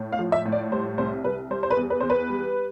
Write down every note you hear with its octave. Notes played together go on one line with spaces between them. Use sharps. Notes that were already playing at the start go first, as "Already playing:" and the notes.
Already playing: A2
F5
F3
E5
A2
D5
G3 C5
C2 C5
C2 B4
G3 C5
C5
B4
E2
B4
E2 C5
B4
G3